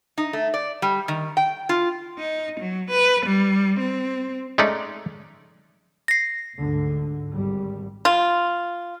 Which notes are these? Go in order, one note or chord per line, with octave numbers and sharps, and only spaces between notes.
D#4
A3
D5
G3
D#3
G5
F4
D#4
F#3
B4
G3
C4
G#3 A3 C#4 D#4 D5
A#6 C7
D2 G#2 D3
G#1 G3
F4